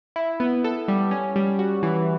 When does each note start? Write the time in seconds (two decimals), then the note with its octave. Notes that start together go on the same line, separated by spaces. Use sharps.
0.16 E4
0.40 B3
0.64 A4
0.88 G3
1.11 C#4
1.36 G3
1.59 F#4
1.83 E3